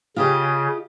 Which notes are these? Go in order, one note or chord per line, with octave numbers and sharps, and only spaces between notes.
C#3 F4 G4 D#5